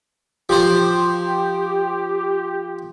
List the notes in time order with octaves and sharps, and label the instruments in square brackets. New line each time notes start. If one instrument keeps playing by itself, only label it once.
[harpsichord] F3 C5 [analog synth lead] G4